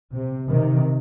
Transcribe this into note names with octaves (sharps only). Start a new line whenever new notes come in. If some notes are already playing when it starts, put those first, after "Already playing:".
C3
C3 D#3